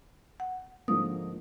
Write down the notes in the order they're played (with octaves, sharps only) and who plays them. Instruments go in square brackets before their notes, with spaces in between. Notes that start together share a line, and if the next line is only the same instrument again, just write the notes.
[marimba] F#5
[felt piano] G#2 D3 F3 [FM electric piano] A#3 [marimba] D#6